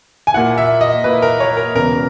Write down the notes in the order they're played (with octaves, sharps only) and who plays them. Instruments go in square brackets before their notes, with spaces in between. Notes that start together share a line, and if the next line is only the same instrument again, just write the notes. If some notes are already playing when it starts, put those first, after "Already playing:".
[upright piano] G#5
[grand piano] A#2 A#3 E4 [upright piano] F#5
[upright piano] E5
D#5
[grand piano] A#2 A#3 E4 [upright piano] B4
[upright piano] A#4
C#5
A#4
[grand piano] E1 E2 C#3 E3 [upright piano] A#4